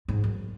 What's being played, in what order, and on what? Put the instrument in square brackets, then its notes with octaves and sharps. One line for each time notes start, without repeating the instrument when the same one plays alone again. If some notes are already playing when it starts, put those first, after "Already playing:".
[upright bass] G#2
F#2